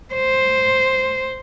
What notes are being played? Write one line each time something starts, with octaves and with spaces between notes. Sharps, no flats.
C5